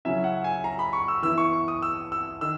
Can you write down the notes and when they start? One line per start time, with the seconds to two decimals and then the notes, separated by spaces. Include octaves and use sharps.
0.05 C#3 F#3 C#4 E4 E5
0.24 F#5
0.44 G#5
0.64 A#5
0.79 B5
0.93 C#6
1.08 E6
1.22 E3 B3 E4 E6
1.38 C#6
1.53 C#6
1.68 D#6
1.82 E6
2.12 E6
2.41 D#3 E6